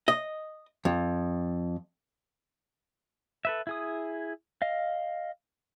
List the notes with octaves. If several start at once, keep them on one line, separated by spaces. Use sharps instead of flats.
D#5
F2
A4 B4 E5
E4 G#4 D#6
D#5 F5